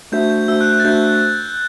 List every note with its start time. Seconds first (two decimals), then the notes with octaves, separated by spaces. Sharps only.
0.12 A3 D4 F#4 C5 E5 G6
0.30 G6
0.48 A3 D4 F#4 C5 E5 E6
0.61 F#6
0.73 F#6
0.80 A6
0.84 A3 D4 F#4 C5 E5 G6